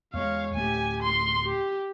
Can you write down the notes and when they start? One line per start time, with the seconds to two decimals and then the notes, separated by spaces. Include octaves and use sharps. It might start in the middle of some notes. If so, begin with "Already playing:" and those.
0.14 E2 G#3 C#5 F5
0.54 D1 A3 G4 G#5
1.03 C6
1.45 G4